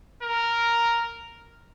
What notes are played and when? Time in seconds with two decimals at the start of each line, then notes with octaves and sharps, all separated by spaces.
0.22 A#4